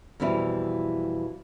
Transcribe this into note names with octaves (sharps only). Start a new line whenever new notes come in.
F2 B2 E3 G3 E4